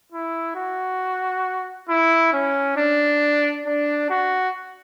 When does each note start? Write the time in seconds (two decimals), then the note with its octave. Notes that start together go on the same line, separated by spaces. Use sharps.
0.12 E4
0.56 F#4
1.89 E4
2.33 C#4
2.77 D4
3.66 D4
4.10 F#4